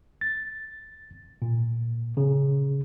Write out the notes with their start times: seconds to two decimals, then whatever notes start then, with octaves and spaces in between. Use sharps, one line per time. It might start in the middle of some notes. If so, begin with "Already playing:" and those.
0.21 A6
1.42 A#2
2.17 C#3